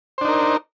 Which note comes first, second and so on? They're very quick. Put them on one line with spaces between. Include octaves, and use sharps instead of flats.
C5 D4 D#4 A#4